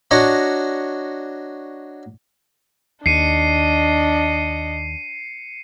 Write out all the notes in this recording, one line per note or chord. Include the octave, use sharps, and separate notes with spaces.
D4 F#4 C#5 D#5 A#5
D#2 D4 D#5 C7 C#7 D#7